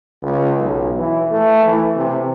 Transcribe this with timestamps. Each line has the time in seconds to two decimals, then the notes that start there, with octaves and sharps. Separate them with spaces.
0.22 C#2
0.59 B1
0.99 E3
1.31 A3
1.65 E3
1.96 C3